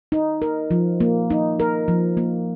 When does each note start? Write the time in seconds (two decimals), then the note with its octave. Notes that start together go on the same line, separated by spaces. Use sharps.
0.12 D#4
0.42 A#4
0.71 F3
1.00 A#3
1.30 D#4
1.60 A#4
1.88 F3
2.17 A#3